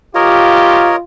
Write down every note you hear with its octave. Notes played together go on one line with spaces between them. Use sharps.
F4 G4 A#4 C#5 D#5